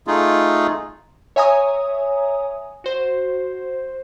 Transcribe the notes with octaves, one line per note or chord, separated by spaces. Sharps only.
A3 D#4 F4 G#4
C#5 E5 G#5 A#5 D#6
F#4 C5